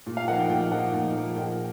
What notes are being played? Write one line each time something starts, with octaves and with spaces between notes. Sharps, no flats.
A#2
F5
F3 A#3 D#4 F#5
G5
A#2 G5
F3 A#3 D#4 F#5
A#2
F3 A#3 D#4
A#2 G5